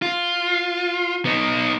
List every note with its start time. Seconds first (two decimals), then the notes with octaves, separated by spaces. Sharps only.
0.02 F4
1.25 B3 D#4